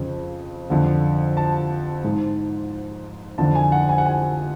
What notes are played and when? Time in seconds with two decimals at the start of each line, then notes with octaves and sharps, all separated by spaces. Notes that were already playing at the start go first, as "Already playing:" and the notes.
Already playing: F2 C#3
0.70 F2 D3
1.37 A5
2.04 G#2
3.38 F2 D3 A5
3.55 G#5
3.72 F#5
3.89 G#5
3.98 F#5
4.06 G#5